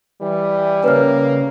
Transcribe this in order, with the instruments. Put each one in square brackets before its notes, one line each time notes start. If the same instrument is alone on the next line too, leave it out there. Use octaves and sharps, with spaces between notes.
[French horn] E3 [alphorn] G3
[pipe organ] C#3 [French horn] A#3 [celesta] B4 C#5 F6